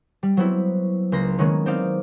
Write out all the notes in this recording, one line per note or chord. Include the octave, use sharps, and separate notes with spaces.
G3
F#3 B3 C4 E4
C#2 A#3 B4 C6 A#6
D#3 F#3 G#3 A#3 B3 C#4
C4 D#4 D5 F5